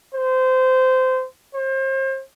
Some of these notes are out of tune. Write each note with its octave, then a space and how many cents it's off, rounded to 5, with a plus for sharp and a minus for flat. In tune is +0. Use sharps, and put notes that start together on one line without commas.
C5 -20
C5 +35